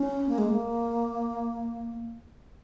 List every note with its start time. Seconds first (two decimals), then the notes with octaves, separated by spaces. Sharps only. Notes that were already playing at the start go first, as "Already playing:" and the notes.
Already playing: C#4
0.29 A#3
0.38 G#3
0.49 A#3